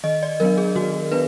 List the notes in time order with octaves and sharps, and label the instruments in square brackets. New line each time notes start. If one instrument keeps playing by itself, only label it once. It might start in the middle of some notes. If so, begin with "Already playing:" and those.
[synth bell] D#3 D#5
D5
F#3 B3 D4 A#4
G#4
D#3 F#4
B3 D4 B4